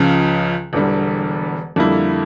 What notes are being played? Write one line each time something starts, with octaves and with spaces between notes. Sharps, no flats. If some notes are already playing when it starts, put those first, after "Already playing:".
Already playing: C#2 C#3 F3
E1 E2 D3 G3
F2 D3 G3 A#3 E4